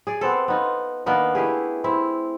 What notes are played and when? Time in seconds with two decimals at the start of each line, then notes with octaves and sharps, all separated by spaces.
0.07 G#4 D5
0.21 B3 C4 A4
0.48 B3 D#4 F4
1.06 D#3 A#3 B3 D4
1.35 A3 E4 G4 G#4
1.84 C4 E4